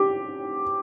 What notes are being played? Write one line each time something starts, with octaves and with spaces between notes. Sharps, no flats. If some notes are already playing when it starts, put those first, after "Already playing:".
Already playing: G4